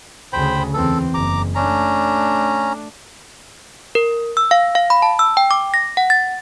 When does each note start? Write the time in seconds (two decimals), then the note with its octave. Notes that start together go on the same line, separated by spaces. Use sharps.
0.33 D2 C#3 C5 G5 B5
0.74 E2 C4 A4
1.14 F#1 A#5 D6
1.55 A3 C#4 D4 A#5
3.95 A#4
4.37 E6
4.51 F5
4.75 F5
4.90 B5
5.02 A5
5.19 E6
5.37 G5
5.51 D6
5.74 A#6
5.97 F#5
6.10 A6